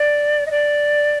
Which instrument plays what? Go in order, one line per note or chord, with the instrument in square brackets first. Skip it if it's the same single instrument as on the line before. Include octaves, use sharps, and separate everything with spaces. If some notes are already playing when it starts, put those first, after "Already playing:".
Already playing: [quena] D5
D#5
D5